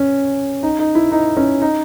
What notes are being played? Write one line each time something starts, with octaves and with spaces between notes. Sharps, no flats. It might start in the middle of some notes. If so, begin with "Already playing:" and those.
Already playing: C#4
D#4
D#4
E4
D#4
C#4
D#4